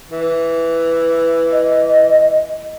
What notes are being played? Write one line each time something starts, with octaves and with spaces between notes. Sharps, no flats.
E3
D#5